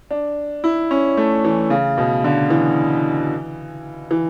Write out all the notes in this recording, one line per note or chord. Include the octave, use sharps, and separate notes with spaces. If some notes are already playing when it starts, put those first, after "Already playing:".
D4
E4
C#4
A3
E3
C#3
B2
D3
E3
E3